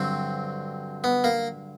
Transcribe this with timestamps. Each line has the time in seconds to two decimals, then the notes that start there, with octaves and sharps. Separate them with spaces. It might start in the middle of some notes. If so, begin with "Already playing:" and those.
Already playing: G2 D3 F#3 C4
1.04 B3
1.24 A#3